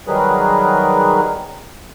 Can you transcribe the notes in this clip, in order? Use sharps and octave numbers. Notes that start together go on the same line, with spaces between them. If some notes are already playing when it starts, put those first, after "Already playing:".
D#3 F#3 G3 G#4 A#4 B4